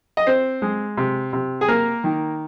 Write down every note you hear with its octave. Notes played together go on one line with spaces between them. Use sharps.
D#5
C4 C5
G#3
C3
C3
G#4
A#3 A#4
D#3